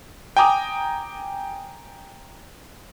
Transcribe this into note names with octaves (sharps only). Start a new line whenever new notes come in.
G5 G#5 A#5 D6 D#6